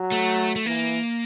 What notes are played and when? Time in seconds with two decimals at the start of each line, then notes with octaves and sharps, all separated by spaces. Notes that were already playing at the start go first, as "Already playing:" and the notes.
Already playing: F#3
0.12 A3
0.56 A3
0.66 E3 A#3